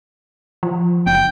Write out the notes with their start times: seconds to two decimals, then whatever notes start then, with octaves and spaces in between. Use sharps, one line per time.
0.63 F3
1.06 F#1 G5